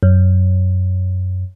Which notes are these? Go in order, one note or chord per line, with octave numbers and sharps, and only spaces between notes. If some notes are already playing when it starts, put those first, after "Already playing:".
F#2